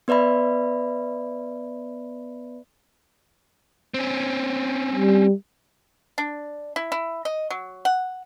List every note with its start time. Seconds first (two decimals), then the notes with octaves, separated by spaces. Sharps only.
0.08 B3 B4 D5 E5 B5
3.94 C4 C#4
4.95 G3
6.18 D4
6.76 E4
6.92 E4
7.25 D#5
7.50 F#3
7.85 F#5